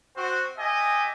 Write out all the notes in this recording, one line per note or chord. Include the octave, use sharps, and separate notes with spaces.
C4 F#4
G4 D#5 E5 G#5